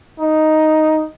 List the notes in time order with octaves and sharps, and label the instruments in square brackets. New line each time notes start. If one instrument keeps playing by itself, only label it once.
[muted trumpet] D#4